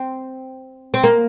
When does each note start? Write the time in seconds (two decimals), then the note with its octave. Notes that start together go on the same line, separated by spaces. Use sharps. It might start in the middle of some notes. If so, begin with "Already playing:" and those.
Already playing: C4
0.94 C4
1.04 A#3